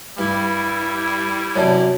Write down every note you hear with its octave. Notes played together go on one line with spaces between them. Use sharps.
G2 G3 E4
F#2 C3 C#5 D5 A5